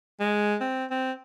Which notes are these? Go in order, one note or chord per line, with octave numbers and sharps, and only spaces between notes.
G#3
C4
C4